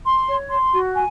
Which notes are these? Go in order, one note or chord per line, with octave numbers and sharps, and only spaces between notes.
C6
C#5
C6
F#4
G#5